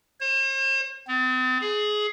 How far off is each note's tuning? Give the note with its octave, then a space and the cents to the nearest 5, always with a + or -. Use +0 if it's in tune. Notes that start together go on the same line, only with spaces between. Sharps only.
C5 +45
C4 -45
G#4 +20